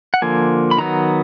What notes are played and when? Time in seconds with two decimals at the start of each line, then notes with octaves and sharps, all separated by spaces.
0.14 F#5
0.22 D3 F3 A#3 G#5
0.71 B5
0.78 D#3 F#3 B3 A#5